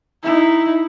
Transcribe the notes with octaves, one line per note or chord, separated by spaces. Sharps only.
D#4 E4